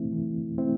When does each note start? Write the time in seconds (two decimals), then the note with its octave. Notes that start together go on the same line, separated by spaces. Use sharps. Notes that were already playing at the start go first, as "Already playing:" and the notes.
Already playing: E3 A3 C4 E4
0.13 E3
0.58 A3 C4 E4